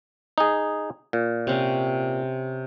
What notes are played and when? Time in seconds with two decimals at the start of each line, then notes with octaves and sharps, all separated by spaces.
0.38 D#4 G#4
1.13 A#2
1.47 C3 C#4